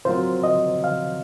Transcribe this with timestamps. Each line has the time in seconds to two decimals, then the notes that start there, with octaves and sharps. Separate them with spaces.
0.05 F#3 C4 F4 A#4 C5
0.44 D#5
0.84 F5